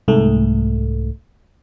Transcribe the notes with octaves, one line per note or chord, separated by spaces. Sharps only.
C2 G#2 A3